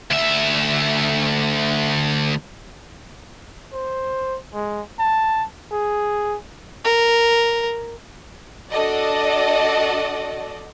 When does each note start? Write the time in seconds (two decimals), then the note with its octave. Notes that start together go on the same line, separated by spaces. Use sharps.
0.11 D2 E5
3.73 C5
4.54 G#3
4.99 A5
5.72 G#4
6.85 A#4
8.71 D4 F#4 A4 D5 D#5